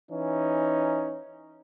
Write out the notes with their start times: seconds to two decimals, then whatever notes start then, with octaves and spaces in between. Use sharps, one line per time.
0.10 E3 C#4 D#4